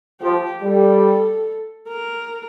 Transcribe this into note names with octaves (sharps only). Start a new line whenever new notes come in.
F3 G4
G3 A4
A#4